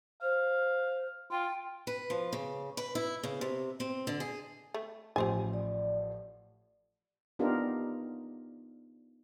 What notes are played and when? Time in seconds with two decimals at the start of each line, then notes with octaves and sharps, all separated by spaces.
0.22 C5 F5
1.32 F4 G5
1.87 B4
2.10 F3
2.33 C#3
2.77 B4
2.95 E4
3.23 C#3
3.41 C3
3.80 C4
4.07 D3
4.20 G#4
4.74 A3
5.16 A1 A2 F3 G4 C5 G#5
5.53 D5
7.39 B3 D4 D#4 F4 G4 A#4